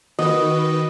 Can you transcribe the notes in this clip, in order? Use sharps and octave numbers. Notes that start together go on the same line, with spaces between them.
D#3 F#4 B4 D#5